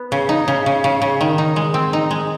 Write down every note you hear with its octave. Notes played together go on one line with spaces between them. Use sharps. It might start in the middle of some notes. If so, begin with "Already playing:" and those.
Already playing: B3
C#3
D#4
C#3
C#3
C#3
C#3
D#3
D#4
G#3
C4
D#4
G#3